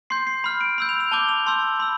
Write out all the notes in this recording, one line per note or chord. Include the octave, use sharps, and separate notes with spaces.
C6 G6 C7
C7
B5 F6
D7
B5 E6 G6
F7
F7
A5 D6 G6 G7
F7
A5 C6 E6 G6
B5 E6